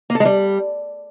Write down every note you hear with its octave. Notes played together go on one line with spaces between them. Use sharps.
A#3
A4
G#3
G3